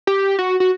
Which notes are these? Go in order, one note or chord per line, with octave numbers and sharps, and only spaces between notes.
G4
F#4
F#4